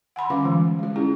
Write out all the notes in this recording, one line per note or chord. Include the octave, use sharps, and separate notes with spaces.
F#5 G#5 B5 C6
D3 G3 C#4 F4 F5 D6
E3 G3 G#3
G#3 F4
C#4 E4 G#4